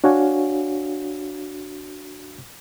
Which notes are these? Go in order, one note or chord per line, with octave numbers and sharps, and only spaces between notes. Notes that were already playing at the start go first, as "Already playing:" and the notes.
D4 F#4 C#5 F5 G#5